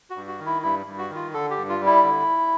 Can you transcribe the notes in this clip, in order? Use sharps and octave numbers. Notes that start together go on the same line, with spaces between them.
F#4
G2
F#4
D#3
E4
G2 E4
G2
F#4
D#3
F4
D3 A4
G4
G2
F4
G3
E4
D3